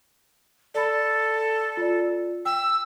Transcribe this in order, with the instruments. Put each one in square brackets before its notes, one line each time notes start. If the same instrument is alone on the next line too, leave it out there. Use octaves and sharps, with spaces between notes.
[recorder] A4 [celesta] D5 B5
[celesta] F4 D5
[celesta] G5 [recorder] E6